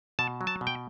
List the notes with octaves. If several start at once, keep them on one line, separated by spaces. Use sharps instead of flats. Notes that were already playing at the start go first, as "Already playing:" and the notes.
B2 A5
F#3
A5
B2
G5